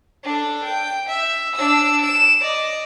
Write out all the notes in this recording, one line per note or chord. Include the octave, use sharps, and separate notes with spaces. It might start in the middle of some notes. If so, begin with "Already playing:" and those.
D4 A4
G5
E5
D4 E6
D7 E7
D5 D#5